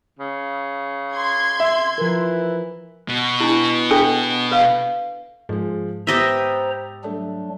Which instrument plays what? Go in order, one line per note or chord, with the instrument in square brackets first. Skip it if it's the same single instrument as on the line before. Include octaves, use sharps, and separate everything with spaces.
[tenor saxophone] C#3
[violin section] C6 G#6
[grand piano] E5
[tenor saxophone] E3 [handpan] F3 A#4
[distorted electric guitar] B2
[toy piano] D4 E4
D4 A4 G5
B4 F5
[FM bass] G#2 [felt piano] F3 G#3
[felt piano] B3 A6 [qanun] G4 D#5 E5 [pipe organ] C5 A#5
[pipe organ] F#3 G3 D4 [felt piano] A3